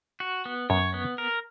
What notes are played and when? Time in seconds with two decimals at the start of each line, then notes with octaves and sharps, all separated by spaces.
0.20 F#4
0.46 B3
0.70 F#2 C#5
0.94 B3
1.18 A#4